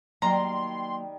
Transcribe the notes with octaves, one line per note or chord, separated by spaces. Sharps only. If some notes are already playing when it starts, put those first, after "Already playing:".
D#3 F#3 G3 A#3 A#5 C6